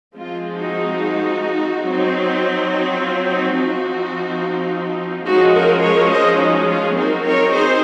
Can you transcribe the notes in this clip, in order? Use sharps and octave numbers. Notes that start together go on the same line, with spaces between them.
F3 G#3 C4 F4
D#4 F#4
F#3 C4 D#4
D#4
F4
D#4 F#4
F3 C4 D#4
F3 G#3 C#4 D#4 F#4
F#4 A#4
A#4 C#5
C5 D#5
D#4 F#4
F4 G#4
F#3 C4 D#4 F#4 A#4
A#4 C#5
G#4 C5